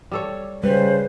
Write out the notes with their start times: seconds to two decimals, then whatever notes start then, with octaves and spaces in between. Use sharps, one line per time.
0.11 G3 A4 C#5
0.63 C#3 G3 B4 C5